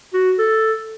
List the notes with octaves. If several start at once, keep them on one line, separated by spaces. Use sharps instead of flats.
F#4
A4